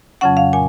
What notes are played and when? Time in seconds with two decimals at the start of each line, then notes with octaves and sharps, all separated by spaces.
0.21 F2 C#3 F#3 C#4 F#5
0.37 F5
0.53 A#2 G#5